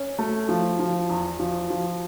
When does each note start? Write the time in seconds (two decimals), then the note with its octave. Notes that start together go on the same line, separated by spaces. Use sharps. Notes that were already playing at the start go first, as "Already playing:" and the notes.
Already playing: C#4
0.19 A3
0.49 F3
0.79 F3
1.10 E2
1.39 F3
1.70 F3